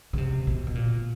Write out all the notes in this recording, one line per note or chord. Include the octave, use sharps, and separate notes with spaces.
C#3
C3
B2
B2
A#2